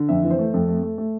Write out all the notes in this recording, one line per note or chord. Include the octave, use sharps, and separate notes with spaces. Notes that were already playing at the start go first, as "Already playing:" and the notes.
Already playing: D3
F2 E5
E3
C5
A3
F2 A4
A3
A3
A3